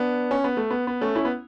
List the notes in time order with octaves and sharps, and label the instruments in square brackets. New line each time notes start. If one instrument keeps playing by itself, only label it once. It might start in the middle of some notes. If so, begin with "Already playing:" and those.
Already playing: [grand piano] B3 D4
C#4
B3
A3
B3
B3
A3 C#4
C#4 E4
B3